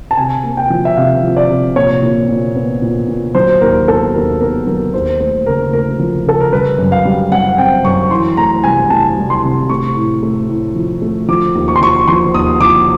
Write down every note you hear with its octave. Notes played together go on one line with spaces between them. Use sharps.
A5
C3 G#5
A#3
G5
F3
E5
C3 F5
F3
D5
C3
A#2 C#5
A#2
A#2
B3
A#2
A#2
F#3 C5
D#2 A#4
B3 A4
D#2 A#4
B3 A#4
F#3 A#4
D#2 C5
A3 C5
C#3 A#4
A3 A#4
F3
C#3 A4
A#4
G3 B4
F#2
F5
G3
G3 F#5
C4 G5
F#2 C#6
E3 C6
A3 A#5
C2 G#5
A3 A5
C2
C6
C3
A3 C#6
A2
A3
A2
F3
A3
F3 D6
D#2
C#6
C6
F3 C#6
F3 C6
D#2 D#6
F3 D6